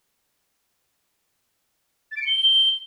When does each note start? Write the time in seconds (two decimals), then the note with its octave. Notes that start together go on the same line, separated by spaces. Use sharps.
2.11 A6
2.17 D7
2.22 C#7
2.27 G7